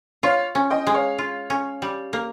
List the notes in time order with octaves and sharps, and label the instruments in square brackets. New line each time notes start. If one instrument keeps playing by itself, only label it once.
[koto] F4 [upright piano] C#5 F5
[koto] C#4
[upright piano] D#5 G5
[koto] G#3
[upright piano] C#5 F5
[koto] F4
C#4
G3
A#3